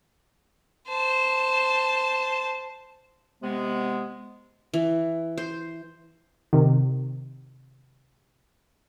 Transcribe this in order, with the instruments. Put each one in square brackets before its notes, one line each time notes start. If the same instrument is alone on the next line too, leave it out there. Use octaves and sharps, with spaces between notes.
[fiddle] C5 A5
[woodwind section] C3 G#3 B3
[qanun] E3
C5
[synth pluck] C3 D#3